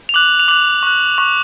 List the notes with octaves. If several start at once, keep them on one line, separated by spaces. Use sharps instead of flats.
F7
D6 F#6 F#7
F7
D6 F#6 F#7
C#6 F#6
C#6 F#6